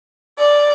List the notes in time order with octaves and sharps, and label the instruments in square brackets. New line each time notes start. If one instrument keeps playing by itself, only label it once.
[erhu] D5